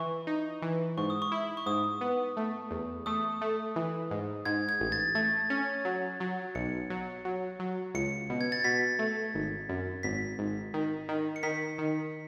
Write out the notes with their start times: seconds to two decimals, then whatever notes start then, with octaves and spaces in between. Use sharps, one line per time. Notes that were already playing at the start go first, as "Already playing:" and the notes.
Already playing: E3 C#6
0.27 D#4
0.62 E3
0.97 G#2 C#6
1.10 D#6
1.22 C#6
1.32 E4
1.57 C#6
1.66 G#2 D#6
2.01 B3
2.37 A3
2.71 E2
3.06 A3 D#6
3.41 A3
3.76 E3
4.11 G#2
4.45 G#2 G#6
4.69 G#6
4.80 A1
4.92 A6
5.15 A3 A6
5.50 C#4
5.85 F#3
6.20 F#3
6.55 B1 C#7
6.90 F#3
7.25 F#3
7.59 F#3
7.94 C#2 C#7
8.30 B2
8.41 G#6
8.52 A6
8.64 B2 B6
8.99 A3
9.34 G#1
9.69 F#2
10.03 G#1 B6
10.39 G#1
10.74 D#3
11.09 D#3
11.36 C#7
11.43 D#3 B6
11.78 D#3